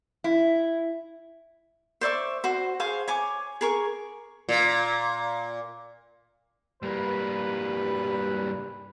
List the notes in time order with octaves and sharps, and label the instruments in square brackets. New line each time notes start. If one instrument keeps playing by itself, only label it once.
[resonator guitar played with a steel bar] E4
[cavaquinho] C5 D5 E5 C#6
F#4 C5
G#4 C5 C#5 F5
C#5 G#5 D6
G#4 A#4 C#6
[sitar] A#2
[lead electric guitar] G2 A#3 [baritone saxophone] G3 [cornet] B4